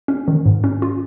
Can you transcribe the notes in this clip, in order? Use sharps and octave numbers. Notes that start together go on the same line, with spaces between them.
C#4
D#3
G#2
C#4
F4